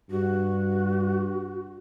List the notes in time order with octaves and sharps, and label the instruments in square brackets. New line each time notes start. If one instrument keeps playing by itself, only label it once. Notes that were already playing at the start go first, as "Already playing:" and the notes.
[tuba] G2 [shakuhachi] F#4